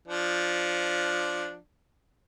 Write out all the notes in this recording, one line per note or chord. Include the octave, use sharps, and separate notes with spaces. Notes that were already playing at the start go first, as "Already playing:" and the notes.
F3 D4